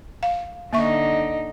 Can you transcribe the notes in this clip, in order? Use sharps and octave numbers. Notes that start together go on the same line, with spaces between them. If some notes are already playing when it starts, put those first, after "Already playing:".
F5
D3 A#3 D#4 E5 C#6